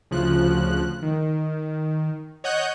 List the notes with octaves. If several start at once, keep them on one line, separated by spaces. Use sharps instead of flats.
D2 C#3 F3 F#6
D#3
C#5 D#5 F#5 F#6 G6